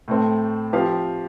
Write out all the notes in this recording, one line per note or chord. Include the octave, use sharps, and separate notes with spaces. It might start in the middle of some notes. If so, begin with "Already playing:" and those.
A2 A3 C4
F3 C4 G4 F5